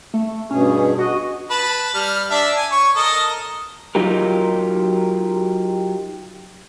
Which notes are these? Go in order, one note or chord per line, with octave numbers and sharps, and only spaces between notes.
A3
G2 B2 C#4 G#4
F#4 D#5
B4 A5 B5
G3 F6
D4 E5
G#5
C#5 C#6
A4 A#4 D#5
F#3 D#4 F4 G4 A#4